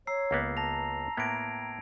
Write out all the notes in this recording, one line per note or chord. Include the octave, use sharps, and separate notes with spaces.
C#5 A#5 E6 C7
C#2 A#3 B3
A5 A#5 A#6 F7
A2 A#3 B3 G#6 D7